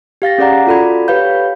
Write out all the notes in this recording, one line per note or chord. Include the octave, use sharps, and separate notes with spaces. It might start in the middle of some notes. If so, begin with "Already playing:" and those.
G4 F5 A6 A#6
C#4 G#4 D5 F#5 A#5
F4 F#4 A4 D5 B5 G#6
G4 B4 C#5 F5 B5 G6